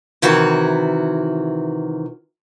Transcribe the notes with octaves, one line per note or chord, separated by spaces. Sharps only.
C3 D#3 E3 F#4